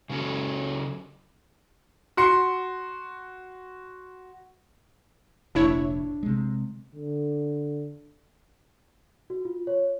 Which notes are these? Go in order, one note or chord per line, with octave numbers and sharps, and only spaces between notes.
C#3 F#3 C#4 F#4 A4
F#4 C6 C#7
F1 A#1 D4 E4 C#5
C3 G#3
D3
F#4
F4
C#5